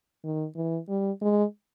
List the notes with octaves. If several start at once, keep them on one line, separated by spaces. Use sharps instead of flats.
D#3
E3
G3
G#3